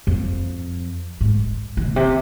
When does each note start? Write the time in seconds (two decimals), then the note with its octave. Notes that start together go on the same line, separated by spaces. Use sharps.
0.07 F2
1.21 G#2
1.77 E3
1.89 A#2
1.96 C3